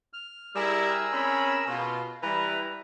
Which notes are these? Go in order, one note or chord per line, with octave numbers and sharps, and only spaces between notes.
F6
G3 E4 G#4 A#4 E6
C4 C#4 B5
B2 F4
E3 G3 E4 B4 A#5